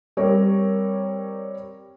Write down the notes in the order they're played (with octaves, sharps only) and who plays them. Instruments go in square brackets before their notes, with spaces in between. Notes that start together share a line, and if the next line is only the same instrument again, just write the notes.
[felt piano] G3 C4 A#4 C#5